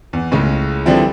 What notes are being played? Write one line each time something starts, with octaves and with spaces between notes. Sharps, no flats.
E2
C#2 A2 C#3
D3 E3 F3 G3 C4 E4